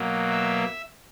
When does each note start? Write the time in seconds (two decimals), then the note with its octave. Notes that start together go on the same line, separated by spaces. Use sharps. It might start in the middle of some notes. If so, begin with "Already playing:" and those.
Already playing: B2 F#3 A#3
0.30 E5